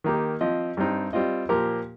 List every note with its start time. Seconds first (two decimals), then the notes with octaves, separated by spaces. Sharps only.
0.04 D#3 A#3 D#4 G4
0.41 F3 C4 F4 D#5
0.77 G2 G3 C4 D#4
1.13 G3 C4 F4 D#5
1.49 A#2 F3 A#3 G4 A#4